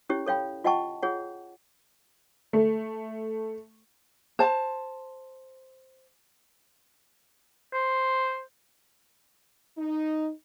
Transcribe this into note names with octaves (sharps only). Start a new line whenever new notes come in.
C#4 E4 G4 C#5
A4 C#5 F5 G5 B5
F4 D#5 F#5 G5 A5 C#6
F4 G#4 C#5 F#5
A3
C5 A5
C5
D#4